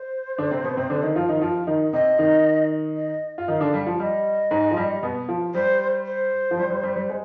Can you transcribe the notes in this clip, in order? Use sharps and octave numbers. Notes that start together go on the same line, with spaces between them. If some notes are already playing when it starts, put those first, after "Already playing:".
Already playing: C5
D3 D4
C3 C4
B2 B3
C3 C4
D3 D4
D#3 D#4
F3 F4
D#3 D#4
F3 F4
D#3 D#4
C3 C4 D#5
D#3 D#4
D#5
F4
D#3 D#4 F5
D3 D4
G3
F3
G3 D#5
G#2 G#3
F3
G3
B2 B3
F3
G3 C5
C5
F3
G3
G3
G3
G3
G#3